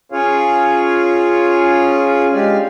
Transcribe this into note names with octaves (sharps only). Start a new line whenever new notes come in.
C#4 F4 G#4 C#5 F5
G#3 D4 G4 D5 F5